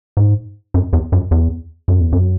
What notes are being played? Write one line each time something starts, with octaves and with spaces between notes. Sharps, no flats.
G#2
F#2
E2
F#2
E2
F#2
E2
F#2